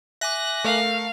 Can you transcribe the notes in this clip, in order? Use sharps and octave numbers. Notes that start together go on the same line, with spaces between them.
E5 G#5 D6 F#6 A#6
A3 A#4 F5